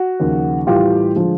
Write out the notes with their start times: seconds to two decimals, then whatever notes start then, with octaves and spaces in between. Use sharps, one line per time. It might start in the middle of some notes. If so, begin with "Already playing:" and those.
Already playing: F#4
0.20 D#2 C#3 F3
0.67 A2 E3 G3 F4 G4
1.16 D3 F3 G#3 F4